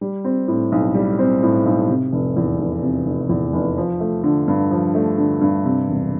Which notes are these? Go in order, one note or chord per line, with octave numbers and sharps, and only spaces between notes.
G3
C4
A2
B1
G3
C4
A2
B1
C3
F1
E2
F1
C3
F1
E2
F1
F3
A3
D3
G2
F3
A3
D3
G2
C3
E1